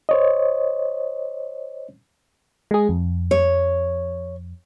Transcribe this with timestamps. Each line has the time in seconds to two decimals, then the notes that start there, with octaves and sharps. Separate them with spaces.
0.09 C5 C#5 D#5
2.71 G#3 G#4
2.89 F2
3.31 C#5